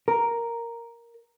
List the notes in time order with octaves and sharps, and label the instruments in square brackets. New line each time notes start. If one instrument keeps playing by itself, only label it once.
[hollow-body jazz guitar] A#4